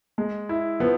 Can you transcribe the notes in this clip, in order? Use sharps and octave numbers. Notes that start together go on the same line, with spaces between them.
G#3
E4
F3 B3